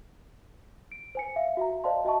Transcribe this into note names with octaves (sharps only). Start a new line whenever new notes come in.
D7
C5 G#5 C#7
E5 F5
F#4 E5 A#5
C5 D5 D#5 F5 A5 C6
F#4 D#5 E5 A5 C#6